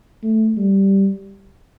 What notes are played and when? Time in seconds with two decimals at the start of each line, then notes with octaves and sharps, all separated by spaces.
0.23 A3
0.57 G3